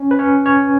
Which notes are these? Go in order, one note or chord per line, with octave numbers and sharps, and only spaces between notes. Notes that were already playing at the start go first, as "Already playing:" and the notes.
Already playing: C#4
B4
C#4 C#5
C#4 C#5